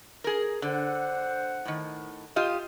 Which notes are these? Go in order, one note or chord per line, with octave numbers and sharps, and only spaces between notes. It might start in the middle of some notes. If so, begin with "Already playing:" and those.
G#4 A#4
D3 C5 F#5
A2 D#3
F4 G4 D#5